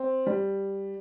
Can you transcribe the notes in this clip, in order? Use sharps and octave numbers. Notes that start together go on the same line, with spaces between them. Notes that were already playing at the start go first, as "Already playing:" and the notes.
Already playing: C4
G3